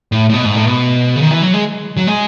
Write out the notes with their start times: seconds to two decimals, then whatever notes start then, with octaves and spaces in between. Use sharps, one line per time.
0.12 A2
0.30 A2
0.34 B2
0.45 G#2
0.56 A2
0.67 B2
1.16 C#3
1.21 D#3
1.31 E3
1.42 F#3
1.54 G#3
1.97 F#3
2.07 G#3